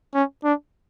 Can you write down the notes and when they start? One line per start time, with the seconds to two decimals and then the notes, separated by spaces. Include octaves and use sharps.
0.14 C#4
0.44 D4